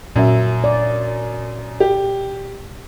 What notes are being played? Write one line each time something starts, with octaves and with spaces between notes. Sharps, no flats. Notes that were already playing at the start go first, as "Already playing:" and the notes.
F#2 A#2 E5
D5
G4